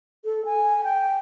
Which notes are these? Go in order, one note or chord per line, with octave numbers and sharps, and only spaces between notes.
A4
G#5
G5